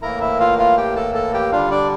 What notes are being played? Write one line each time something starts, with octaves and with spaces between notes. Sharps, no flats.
A2 E3 A#3 E4 A#4 A#5
E4 E5
F4 F5
F4 F5
G4 G5
A4 A5
A4 A5
G4 G5
D3 G3 D4 F4 F5
D4 D5